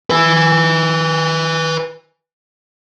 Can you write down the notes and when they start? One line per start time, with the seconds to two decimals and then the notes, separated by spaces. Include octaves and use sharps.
0.10 B4 G#5